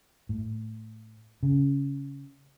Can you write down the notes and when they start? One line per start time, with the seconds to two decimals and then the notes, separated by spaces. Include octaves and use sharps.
0.29 A2
1.43 C#3